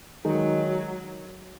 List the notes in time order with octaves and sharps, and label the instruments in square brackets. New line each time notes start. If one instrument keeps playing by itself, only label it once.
[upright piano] D#3 G#3 D#4 [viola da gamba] F#3